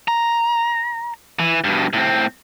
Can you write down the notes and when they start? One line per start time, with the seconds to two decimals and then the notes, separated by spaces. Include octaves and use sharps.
0.08 A#5
1.39 E3
1.64 G2 B2
1.93 A2 C4